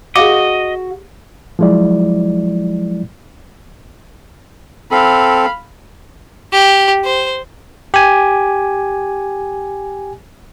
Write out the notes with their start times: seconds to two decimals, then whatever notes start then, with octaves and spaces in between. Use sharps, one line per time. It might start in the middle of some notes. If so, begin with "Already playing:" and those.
0.16 F#4 G#4 D#5 F5 D6
1.59 F3 F#3 G#3 E4 D5
4.91 C4 A4 F5 B5
6.53 G4
7.04 C5
7.94 G4 G#5